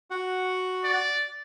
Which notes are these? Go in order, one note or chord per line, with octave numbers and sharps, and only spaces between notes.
F#4 F#5
D5